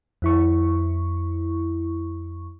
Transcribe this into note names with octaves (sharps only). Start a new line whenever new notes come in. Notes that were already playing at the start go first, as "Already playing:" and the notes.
F2 E4 C#6